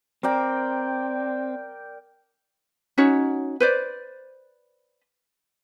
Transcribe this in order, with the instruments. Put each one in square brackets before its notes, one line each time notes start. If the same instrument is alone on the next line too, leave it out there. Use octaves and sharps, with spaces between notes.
[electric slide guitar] C4 [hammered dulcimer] A#4 D5 G5
[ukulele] C#4 D#4 F#4 C#5
B4 C5 D5